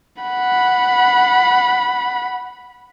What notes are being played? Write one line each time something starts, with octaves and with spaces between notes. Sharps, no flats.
F#5 B5